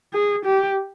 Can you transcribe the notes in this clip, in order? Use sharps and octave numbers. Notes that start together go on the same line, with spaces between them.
G#4
G4